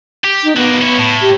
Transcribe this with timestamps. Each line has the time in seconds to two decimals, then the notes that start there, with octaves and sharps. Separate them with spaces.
0.24 G4
0.44 D#4
0.56 F#3 A#3 B3
0.81 C#4 E4
0.99 A2
1.22 G4